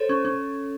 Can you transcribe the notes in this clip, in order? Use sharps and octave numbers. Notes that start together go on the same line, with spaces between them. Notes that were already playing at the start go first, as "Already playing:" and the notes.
Already playing: A4 C5 C#5
C#4
C#4